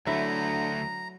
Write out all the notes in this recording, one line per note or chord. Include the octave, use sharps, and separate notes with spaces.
D2 D3 F#3 A3 E4 A#5